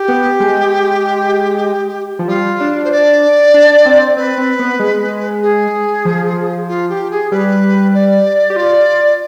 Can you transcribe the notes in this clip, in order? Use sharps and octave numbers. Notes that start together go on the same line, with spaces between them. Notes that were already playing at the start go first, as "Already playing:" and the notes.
Already playing: G4
B3
G#3
F3
G3 F4
D4
C5
D5
D4
C4
C4 B4
C4
B3
G#3
G#4
F3
F4
G4
G#4
G3 B4
D5
G4
F4 D5